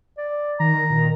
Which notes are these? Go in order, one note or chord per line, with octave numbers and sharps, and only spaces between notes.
D5
D#3 A#5
A#2 D#3